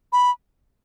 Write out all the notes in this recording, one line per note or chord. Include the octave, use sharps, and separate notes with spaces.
B5